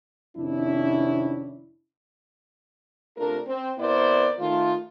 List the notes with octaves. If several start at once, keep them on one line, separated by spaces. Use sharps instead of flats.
F2 C3 D#3 C#4 D4 E4
C3 A3 D4 F4 A#4
C4
C3 B3 E4 A#4 C5 D5
D#3 A3 F4